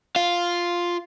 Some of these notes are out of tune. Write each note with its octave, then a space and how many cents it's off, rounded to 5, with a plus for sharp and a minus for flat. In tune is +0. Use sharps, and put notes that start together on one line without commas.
F4 +0 F5 +0